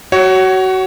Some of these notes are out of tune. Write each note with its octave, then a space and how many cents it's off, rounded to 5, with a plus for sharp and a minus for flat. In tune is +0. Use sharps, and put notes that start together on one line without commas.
F#4 +25 C#5 +0